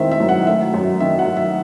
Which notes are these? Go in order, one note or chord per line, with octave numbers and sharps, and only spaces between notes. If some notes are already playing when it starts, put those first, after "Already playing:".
Already playing: D#3 G#3 C4 E4 C5 E5
E5
F#2
F#5
A3 E5
F#2
D#3 E5
F#5
F#2
E5